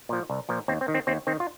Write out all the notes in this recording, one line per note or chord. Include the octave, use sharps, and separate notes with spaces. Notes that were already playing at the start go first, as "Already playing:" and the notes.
A#2 F3
C2
A#2 F3
D#2 C4
C4
D#3
C4
D#2 C4
D#3 C4
F4